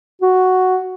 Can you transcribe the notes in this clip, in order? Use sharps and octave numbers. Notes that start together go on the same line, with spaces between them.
F#4